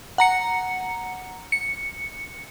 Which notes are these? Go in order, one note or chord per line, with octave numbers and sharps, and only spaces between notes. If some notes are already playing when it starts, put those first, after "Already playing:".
F#5 A#5 C#7
C#7